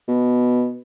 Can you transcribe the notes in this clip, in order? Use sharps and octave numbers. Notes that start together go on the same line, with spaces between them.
B2